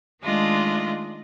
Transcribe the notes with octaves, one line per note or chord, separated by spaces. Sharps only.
D#3 G#3 A3 D4 F4 D#5